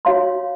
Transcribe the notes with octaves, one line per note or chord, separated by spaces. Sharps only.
F#4 C#5 F5 C6